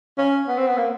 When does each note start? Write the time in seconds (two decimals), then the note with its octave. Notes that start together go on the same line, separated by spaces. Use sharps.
0.18 C#4
0.48 B3
0.58 C4
0.67 B3
0.77 A#3